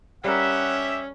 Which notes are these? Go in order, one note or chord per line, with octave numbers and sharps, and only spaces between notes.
G3 C#4 G4 A#4 E5 F#5